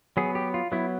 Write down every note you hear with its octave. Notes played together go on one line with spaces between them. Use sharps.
F#3 B3 G#4
G4
F4
F#3 B3 E4